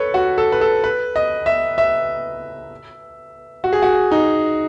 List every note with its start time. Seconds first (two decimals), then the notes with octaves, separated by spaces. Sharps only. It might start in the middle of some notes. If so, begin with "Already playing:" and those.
Already playing: A4 B4 C#5
0.14 F#4
0.38 A4
0.52 B4
0.61 A4
0.84 B4
1.16 D#5
1.46 E5
1.78 E5
3.64 F#4
3.73 G#4
3.82 F#4
4.11 D#4